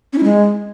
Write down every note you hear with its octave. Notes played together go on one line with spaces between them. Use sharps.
C#4
E4
G#3